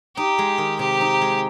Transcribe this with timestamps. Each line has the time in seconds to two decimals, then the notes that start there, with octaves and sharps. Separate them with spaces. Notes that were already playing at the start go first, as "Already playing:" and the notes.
0.17 D#4 G4
0.38 G#3
0.58 D#3
0.79 C3 G4
1.01 D#4
1.21 G#3